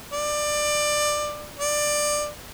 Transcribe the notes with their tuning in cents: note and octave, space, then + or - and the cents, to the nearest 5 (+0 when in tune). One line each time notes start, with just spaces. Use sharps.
D5 +20
D5 +15